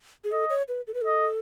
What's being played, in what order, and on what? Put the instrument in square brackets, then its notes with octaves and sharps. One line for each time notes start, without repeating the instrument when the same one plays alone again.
[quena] G#4
[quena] A4 [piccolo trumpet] D#5
[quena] C#5
B4
A4
B4
[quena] A4 [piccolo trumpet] D#5